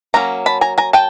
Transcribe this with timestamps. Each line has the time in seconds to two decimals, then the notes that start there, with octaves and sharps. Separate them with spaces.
0.14 F#3 A#3 C#4 A#5
0.46 A5 B5
0.61 G#5 A#5
0.78 G#5 A#5
0.93 G5 A5